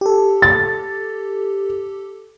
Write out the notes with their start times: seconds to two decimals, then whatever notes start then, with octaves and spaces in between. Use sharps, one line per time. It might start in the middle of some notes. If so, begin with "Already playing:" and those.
0.01 G4 A4
0.42 A6